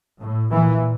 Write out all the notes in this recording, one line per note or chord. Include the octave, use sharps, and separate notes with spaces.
A2
A#2 E3